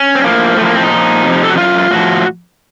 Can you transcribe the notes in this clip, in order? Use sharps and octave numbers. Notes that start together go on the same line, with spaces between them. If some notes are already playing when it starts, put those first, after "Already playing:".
Already playing: C#4
C4
A2 F3 A#3
A2 F3 A3 A#3
C4
D#4
A#2 F3
F2 C3 F3
A4
F#4
F#2 D#3 F4
A2 F3 F#4